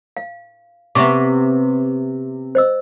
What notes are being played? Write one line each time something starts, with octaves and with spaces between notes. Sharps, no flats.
F5
C3 B3 E5 C#6 D6
C5 D#5 E6